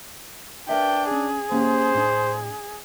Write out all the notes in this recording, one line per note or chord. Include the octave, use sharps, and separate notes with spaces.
D4 A#4 B4 E5 G5
C#4 G#4
A#3 C#4 G4 C5
A2 D4